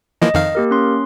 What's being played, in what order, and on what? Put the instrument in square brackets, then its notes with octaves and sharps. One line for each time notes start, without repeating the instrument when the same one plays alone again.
[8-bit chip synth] E3 F3 A#3 [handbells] D#5
[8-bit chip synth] F2 D#3 F5
[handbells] A#3 G4 A#4
C#4 C6